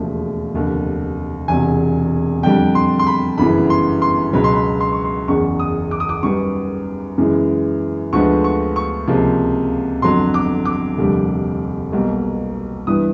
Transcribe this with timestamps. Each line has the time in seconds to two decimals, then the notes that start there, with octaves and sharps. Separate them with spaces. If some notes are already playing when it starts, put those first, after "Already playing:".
Already playing: E1 D#2 C#3 F3 A3
0.53 F1 D#2 D3
1.48 E1 E2 C3 G#5
2.43 F2 D3 G3 G5
2.75 C6
2.99 C6
3.07 B5
3.38 G1 F#2 C#3 E3 B5
3.70 C6
4.02 C6
4.33 C#2 B2 F#3 B5
4.44 C6
4.55 B5
4.80 C6
4.93 C#6
5.04 C6
5.28 F#1 E2 C#3 C#6
5.59 D#6
5.91 D6
6.00 D#6
6.09 D6
6.23 F#2 D#3 G3 B3 C#6
7.18 F#2 C#3 E3 G#3
8.13 D2 D3 F3 G#3 B3 C#6
8.44 C#6
8.76 C#6
9.08 C#2 C3 F3 A#3
10.02 G1 F2 D3 F#3 C6
10.34 D6
10.65 D6
10.98 F1 D#2 D3 G3
11.92 B1 B2 G3 A#3
12.87 G2 E3 G3 B3 D#6